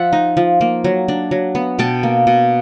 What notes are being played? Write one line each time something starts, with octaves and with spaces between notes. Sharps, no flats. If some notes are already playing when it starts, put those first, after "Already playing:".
Already playing: F3 E5 F#5
D#4
F3
A#3
F#3
D4
F#3
B3
B2 G5 A5
A#3
B2